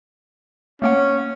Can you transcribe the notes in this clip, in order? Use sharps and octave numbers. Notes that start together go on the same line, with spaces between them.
A3 A#3 C#4 F#5